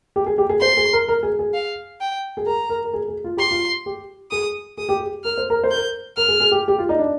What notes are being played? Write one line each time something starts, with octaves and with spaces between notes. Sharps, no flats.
G4
G#4
G4
G#4
C5 C6
G#4
A#4
A#4
G#4
G#4
F5
G5
G#4
A#4 A#5
A#4
A#4
G#4
G#4
F4
G4 C6
F4
G4
G#4 D#6
G#4 D#6
G4
G#4
A#4 F6
C5
A#4
C5
A#4 G6
A#4 F6
G#4
G#4
G4
G4
F4
D#4
D4